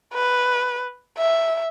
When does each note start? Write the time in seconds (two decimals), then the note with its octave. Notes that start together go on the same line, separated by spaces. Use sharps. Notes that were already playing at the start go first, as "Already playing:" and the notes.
0.14 B4
1.18 E5